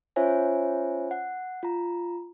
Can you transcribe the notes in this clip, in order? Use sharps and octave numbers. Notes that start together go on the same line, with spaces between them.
C#4 F4 C5 C#5 E5 G#5
F#5
F4 A#5